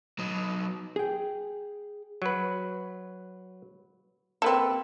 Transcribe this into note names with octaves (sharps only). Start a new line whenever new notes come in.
F#3 D#4
G#4 G5
F#3 B4
A#3 C4 A4 B4